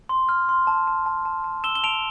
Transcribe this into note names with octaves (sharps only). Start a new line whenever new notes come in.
C6
F6
C6
A5
A5
A5
A5
A5
E6 E7 G7
G7
A5 D7 F7